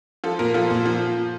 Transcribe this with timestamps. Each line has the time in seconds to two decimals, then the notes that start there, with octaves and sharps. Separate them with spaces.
0.24 F3 A4
0.39 A#2 A#4
0.54 F3 A4
0.70 A#2
0.85 F3